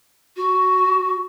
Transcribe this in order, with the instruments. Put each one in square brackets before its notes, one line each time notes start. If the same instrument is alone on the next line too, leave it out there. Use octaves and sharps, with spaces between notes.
[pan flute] F#4